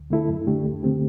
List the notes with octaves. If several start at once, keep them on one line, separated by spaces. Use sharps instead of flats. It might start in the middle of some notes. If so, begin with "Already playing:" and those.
Already playing: D2
D3 A3 E4 A4
F#2
D3 A3 D4 G4
D2
D3 A3 C4 G4